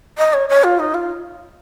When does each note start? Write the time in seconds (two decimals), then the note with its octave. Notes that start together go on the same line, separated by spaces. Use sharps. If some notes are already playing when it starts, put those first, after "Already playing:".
0.18 D#5
0.33 C#5
0.49 C#5
0.64 F4
0.79 D#4
0.94 F4